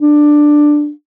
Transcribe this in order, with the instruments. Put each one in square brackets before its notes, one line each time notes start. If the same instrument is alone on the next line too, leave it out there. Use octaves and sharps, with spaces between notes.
[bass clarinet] D4